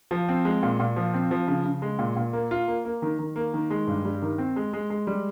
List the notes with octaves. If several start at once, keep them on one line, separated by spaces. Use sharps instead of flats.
F3
C4
G#3
A#2
A#2
F3
C4
F3
C#3
C#3
G#3
A#2
A#2
A#3
F4
A#3
A#3
D#3
D#3
A#3
D#3
G#3
G2
G3
D#3
C4
G#3
G#3
G#3
G3